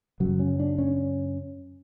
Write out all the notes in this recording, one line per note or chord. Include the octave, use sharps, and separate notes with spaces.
F#2 C#3 F#3
C#4
D4
C#4